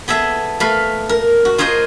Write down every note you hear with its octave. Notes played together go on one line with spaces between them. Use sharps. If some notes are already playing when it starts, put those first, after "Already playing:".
B3 G#4 A4 E5
A3 B4 F5 B5
A#4
F#4
F4 G#4 A#4 C5 D#5